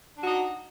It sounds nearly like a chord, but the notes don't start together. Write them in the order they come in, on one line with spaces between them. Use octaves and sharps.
D4 F#4 D#4